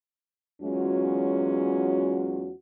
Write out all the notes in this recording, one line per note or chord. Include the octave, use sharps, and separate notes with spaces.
E2 F#3 G#3 C#4 F4 F#4